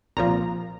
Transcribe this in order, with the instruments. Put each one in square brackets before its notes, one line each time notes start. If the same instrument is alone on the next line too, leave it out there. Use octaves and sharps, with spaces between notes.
[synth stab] C2 A#2 F3 A#5